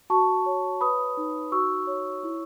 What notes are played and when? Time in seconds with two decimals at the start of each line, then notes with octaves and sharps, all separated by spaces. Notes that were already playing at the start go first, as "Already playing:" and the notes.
0.10 F#4 A5 C#6
0.46 C#5
0.81 B4 B5 D#6
1.17 D#4
1.52 F#4 C#6 E6
1.87 C#5
2.23 E4